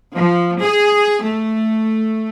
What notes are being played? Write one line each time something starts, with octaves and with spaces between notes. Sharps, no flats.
F3
G#4
A3